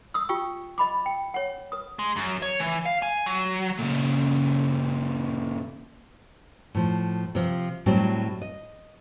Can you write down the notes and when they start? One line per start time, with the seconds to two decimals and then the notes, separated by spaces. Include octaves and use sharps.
0.14 D#6 E6
0.29 F4 G4 G5 C#6 E6
0.78 D#5 B5 D6
1.06 G5
1.34 C#5 F#5
1.72 B4 D#6
1.99 G#3
2.16 F#2
2.42 C#5
2.60 E3
2.86 F5
3.02 G#5
3.26 F#3
3.79 A#2 C#3
6.75 A2 F3
7.35 C3 F3
7.86 A2 F#3 G3 C4 E4
8.42 D#5